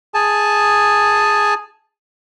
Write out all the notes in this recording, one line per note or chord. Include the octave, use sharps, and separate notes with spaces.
G#4 G#5 A5